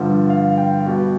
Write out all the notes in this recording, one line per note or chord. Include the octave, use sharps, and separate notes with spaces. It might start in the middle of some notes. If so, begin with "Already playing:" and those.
Already playing: G2 D3 F3
F5
G5
B2 G3